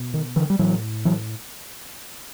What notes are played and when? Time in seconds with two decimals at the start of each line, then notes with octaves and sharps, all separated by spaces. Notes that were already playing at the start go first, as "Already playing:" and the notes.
Already playing: B2
0.14 D#3
0.36 D3 E3
0.50 G3
0.59 A2 E3 F#3
1.05 E3 F#3